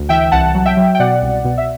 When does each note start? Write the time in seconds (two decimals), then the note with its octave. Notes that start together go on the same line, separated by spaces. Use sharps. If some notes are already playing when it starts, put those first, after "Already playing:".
Already playing: D2
0.09 E3 E5 G5
0.32 C2 F#5 A5
0.55 F#3
0.66 E5 G5
0.77 F#3
0.95 G5
1.00 B2 D5 F#5
1.22 C2
1.45 B2
1.58 E5